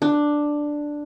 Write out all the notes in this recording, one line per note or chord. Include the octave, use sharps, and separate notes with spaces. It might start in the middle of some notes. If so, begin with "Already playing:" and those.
D4